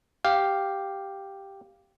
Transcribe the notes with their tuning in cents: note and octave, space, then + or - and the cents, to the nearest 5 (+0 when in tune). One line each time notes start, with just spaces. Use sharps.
G4 +0 F5 +0